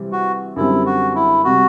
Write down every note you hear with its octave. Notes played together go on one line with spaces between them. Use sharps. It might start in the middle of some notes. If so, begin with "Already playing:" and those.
Already playing: C3 E3 G3 C4
F#4
F#2 D3 G3 C4 E4
F#4
E4
C3 G3 F#4